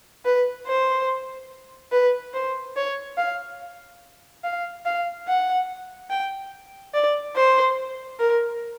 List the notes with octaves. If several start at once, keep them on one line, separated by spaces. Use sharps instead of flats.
B4
C5
B4
C5
C#5
F5
F5
F5
F#5
G5
D5
C5
A#4